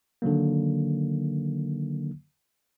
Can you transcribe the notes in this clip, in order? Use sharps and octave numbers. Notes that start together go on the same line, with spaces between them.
D3 D#3 F#3 A#3